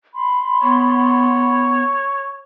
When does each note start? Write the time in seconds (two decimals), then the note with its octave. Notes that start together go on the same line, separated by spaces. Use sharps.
0.15 B5 C6
0.62 B3 C#5